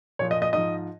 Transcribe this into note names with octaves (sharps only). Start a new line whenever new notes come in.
A#2 F3 C#5
D#5
D#5
G#2 F3 D#5